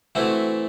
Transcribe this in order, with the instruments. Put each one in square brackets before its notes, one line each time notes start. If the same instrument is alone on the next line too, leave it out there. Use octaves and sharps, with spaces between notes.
[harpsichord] E3 A3 C4 E4 F#4